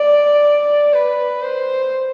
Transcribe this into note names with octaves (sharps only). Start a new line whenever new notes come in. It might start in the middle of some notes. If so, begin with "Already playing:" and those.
Already playing: D5
B4
C5